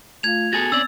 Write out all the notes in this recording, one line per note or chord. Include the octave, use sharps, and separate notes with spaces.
A3 F4 F5 G#6 F7
B3 F#4 G#4 A4 G#5 A6
C4 C#4 D5 E6